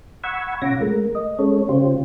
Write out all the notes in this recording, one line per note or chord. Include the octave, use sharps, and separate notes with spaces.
F#5 B5 C#6 E6 G#6
B2 C#4 F4 F#5 D6 A#6
G#3 A3 A#4
D#5
G#3 C#4 A4 C#5
C#3 C#4 F4 G4 C5